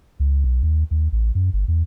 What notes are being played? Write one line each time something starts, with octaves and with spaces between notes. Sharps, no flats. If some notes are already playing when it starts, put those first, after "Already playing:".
C#2
B1
D#2
D#2
A1
F#2
G1
E2